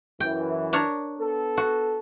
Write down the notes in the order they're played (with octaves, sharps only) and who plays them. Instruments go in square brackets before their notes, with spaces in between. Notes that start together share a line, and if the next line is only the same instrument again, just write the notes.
[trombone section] F#2 E3 [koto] G5
[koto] D4 A#4 C#5
[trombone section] B3 A4
[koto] F#4